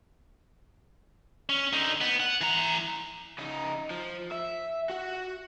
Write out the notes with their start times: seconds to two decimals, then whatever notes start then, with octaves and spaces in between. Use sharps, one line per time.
1.49 C#4
1.73 D3 D#4
2.01 B3
2.20 F#5
2.41 E3 A#5
3.39 C#3 D#4
3.91 F3
4.31 E5
4.90 F#4 F#5